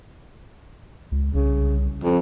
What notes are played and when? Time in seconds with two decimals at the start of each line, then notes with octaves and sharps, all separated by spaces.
1.12 C#2
1.34 C2 C#3
2.03 F2